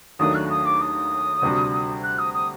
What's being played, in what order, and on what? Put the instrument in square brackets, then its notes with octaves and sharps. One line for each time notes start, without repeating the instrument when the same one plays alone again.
[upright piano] D#2 D#3 F#3 A3 D4 [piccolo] D#6
[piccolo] F#6
D#6
D6
D#6
[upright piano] D2 C3 G3 D4 F#4
[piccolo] F#6
D#6
D#6